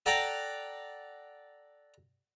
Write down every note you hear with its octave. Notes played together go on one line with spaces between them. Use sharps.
A4 D5 F#5 G5 A#5